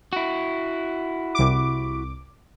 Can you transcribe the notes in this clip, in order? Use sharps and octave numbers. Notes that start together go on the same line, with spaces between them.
E4 F#4
C2 D6